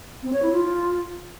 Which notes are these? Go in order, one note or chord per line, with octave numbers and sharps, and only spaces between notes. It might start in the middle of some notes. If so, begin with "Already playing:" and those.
C4
C#5
E4
F4